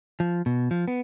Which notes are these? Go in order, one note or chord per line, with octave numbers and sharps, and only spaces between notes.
F3
B2
F3
B3